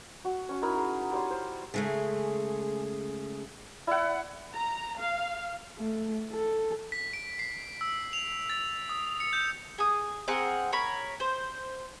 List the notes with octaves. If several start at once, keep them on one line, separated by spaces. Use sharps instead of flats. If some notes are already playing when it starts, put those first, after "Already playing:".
F#4
C#4 C#6
D#4 E4 A#4 B5
G#4
G3 C#5 C6
C5
C#3 G#3 A3 G#4
E4 D5 F#5
A#5
F5
A3
A4
B6
D7
C7
E6
F7
A6
D#6
C#7
G6
G#4 D#6
C4 G#4 A#4 F#5
A#4 C#5 B5
C5